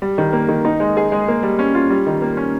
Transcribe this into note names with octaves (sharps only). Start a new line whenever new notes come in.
G3
D#3
A#3
D#3
D#4
G#3
G#4
G#3
A#3
G3
C#4
F4
G3
D#3
A#3
C#4